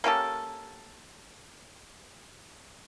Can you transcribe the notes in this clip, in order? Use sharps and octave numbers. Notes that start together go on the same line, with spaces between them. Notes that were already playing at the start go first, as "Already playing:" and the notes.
A#3 C#4 G4 A4